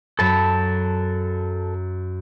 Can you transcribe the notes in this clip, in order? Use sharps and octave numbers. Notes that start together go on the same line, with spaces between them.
F#2 A4 A5 B5